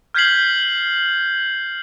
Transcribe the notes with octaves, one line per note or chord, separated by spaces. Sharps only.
F6 G6 G#6 B6 C7 F#7